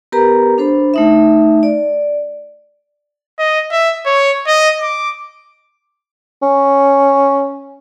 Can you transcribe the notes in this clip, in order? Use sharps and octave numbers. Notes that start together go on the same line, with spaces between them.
B3 G4 A#4 B4 A#5
D4 A4 C5 B5
A3 D#4 E5
D5
D#5
E5
C#5
D#5
D6
C#4